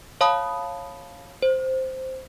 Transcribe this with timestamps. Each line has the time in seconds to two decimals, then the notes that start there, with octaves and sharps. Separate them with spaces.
0.21 C#5 F5 A5 B5 D#6
1.42 C5